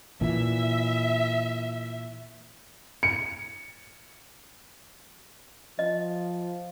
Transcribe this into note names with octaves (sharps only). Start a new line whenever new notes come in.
A#2 E3 E5
C#7
F3 D#5